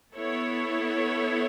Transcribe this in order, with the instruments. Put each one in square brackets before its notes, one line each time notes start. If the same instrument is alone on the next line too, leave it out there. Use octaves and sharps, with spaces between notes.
[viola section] B3 E4 A4 C#5